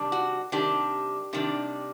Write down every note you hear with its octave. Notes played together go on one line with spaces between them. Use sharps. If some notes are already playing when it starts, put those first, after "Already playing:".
Already playing: C3 D#3 G3 D4
F#4
C3 D#3 G3 D4 G4
C3 D#3 G3 D4